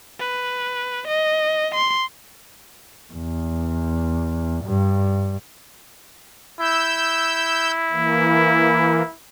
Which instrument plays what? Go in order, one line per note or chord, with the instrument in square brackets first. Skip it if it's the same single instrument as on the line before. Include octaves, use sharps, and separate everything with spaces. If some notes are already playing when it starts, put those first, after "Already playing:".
[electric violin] B4
D#5
C6
[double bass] E2
G2
[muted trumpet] E4 [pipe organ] E6 G6
[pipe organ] E3 A#3